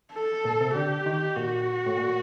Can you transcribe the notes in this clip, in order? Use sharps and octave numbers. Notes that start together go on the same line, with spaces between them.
A4
A#2
C3
D3 G4
D#3
A#2 F#4
A2
A#2